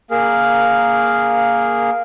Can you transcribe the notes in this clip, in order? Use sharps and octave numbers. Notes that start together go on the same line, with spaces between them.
A#3 G#4 A#4